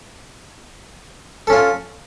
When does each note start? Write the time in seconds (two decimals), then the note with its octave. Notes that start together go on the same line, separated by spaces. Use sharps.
1.47 A4
1.50 C#4
1.52 F4